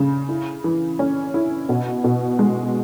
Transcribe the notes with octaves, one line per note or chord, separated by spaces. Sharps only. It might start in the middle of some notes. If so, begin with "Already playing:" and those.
Already playing: C#3
E4
E3
C#4
E4
B2
B2
G#3